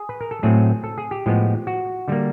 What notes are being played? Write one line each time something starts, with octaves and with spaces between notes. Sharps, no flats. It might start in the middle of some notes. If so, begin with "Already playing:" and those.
Already playing: G#4
B4
A#4
A4
A2 F#3 A3 C4 G#4
A4
G#4
G4
A2 F3 G#3 B3
F#4
D3 G3 A#3